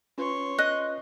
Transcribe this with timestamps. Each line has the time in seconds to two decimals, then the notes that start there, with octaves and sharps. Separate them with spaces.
0.18 C#4 F4 B4 C#5 C6
0.58 D#5 F#6